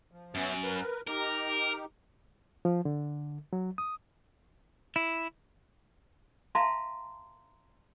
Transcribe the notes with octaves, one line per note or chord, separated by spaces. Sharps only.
F3
F#2 B3 C#4 E5
A#4 B4
D#4 G4 A#4
F3
D3
F#3
D#6
E4
E5 F5 A5 A#5 C6